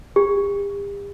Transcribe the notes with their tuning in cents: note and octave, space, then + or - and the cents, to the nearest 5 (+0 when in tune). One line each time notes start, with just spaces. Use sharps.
G4 +40